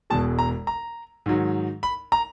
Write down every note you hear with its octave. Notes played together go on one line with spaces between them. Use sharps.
E1 E2 B2 G#3 A5
A#5
A#5
G#2 D#3 F#3
B5
A#5